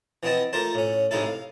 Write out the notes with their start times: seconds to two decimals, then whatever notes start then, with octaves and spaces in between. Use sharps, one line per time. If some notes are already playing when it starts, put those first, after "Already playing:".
0.23 E3 B3 C4 E4 D#5 A5
0.53 A3 A#3 F4 A#4 C5 A5
0.75 A2 C#4
1.11 A2 C3 G#3 D#4 E4 A4
1.26 F5